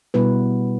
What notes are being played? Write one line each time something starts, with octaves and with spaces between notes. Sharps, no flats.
B2 G3 B3 E4 B4